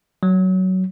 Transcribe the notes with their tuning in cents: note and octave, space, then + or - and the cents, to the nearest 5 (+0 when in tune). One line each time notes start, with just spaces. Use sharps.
F#3 +15